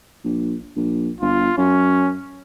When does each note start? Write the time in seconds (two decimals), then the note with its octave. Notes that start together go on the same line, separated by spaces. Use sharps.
0.24 A#1
0.76 A#1
1.21 G1 F4
1.57 F#2 C#4